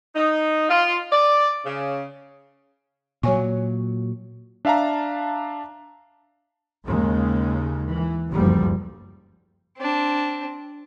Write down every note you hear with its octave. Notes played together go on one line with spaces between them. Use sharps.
D#4
F4
D5
C#3
A#2 F#3 C#5 G#5 C#6
D4 E5 F5 A5 A#5
D#2 C#3 G#3
E3
F#1 D2 G2 F3 G3
C4 D4